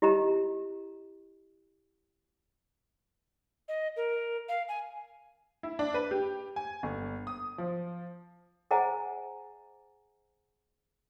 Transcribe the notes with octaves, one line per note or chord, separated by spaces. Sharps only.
E4 G4 D#5 A#5
D#5
A#4
F5
G#5
E4
D4
B4
G4
G#5
G1
D#6
F3
G#4 C5 D#5 F#5 G#5 A#5